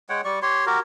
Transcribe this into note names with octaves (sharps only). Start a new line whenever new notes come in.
G#3 C#5 F#5 G5
G3 D5 C#6
G4 C#5 C6
F#4 G4 A#4